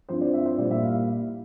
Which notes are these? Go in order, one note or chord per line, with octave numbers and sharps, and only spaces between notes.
G2 F3 C4 E4 C5
D5
E5
C5
A#2 G3 A#3 E4 D5
E5
F5